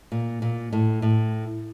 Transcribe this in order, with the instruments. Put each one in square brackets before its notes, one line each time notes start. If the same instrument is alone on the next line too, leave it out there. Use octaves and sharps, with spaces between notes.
[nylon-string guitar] A#2
A#2
A2
A2